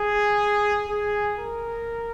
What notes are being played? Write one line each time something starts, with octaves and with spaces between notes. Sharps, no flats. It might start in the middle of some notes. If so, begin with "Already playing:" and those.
Already playing: G#4
G#4
A#4